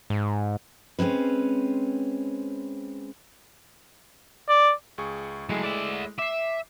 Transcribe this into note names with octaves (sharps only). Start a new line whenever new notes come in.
G#2
G#3 C4 C#4 B4
D5
C#2 G#4 C#6
F#3 G#3 A3 E4 G#4
D5 E5
E5 D6 C7